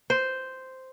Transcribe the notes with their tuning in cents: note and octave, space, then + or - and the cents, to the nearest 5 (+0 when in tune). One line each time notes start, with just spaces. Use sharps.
C5 -5